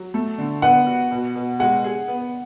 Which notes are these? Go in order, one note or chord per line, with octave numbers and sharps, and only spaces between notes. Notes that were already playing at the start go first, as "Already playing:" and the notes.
Already playing: F#3
A3
D3
B3 F#5
F#4
B2
B2
G#3 F#5
G#4
B3